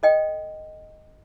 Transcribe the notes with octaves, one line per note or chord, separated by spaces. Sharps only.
A4 D#5 G5